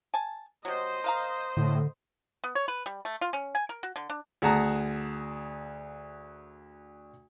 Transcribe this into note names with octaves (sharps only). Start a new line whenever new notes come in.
G#5 A5
C3 F#3 C5 D#5
A#4 F5 A#5
A2 D3
B3
C#5
B4
G3
A3
F4
C#4
G#5
A#4
F#4
D3
D4
D2 G#4 F#5 A5 A#5